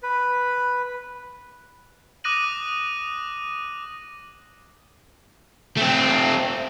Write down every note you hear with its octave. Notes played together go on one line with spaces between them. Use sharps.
B4
D6 D#6 F#6 A#6 D#7 F#7
A3 C4